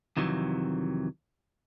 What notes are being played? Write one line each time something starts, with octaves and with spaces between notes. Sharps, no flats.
F2 C3 D#3 E3 F#3